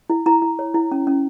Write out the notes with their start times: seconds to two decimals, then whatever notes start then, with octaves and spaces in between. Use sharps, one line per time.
0.10 E4
0.26 E4 A#5
0.42 E4
0.59 C#5
0.74 E4
0.91 C#4
1.07 C#4